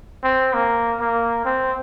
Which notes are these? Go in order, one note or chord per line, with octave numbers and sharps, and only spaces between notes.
C4
A#3
A#3
C4